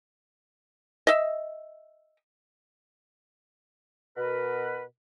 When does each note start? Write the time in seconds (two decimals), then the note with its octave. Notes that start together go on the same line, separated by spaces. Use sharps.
1.07 D#5 E5
4.17 B2 A#4 B4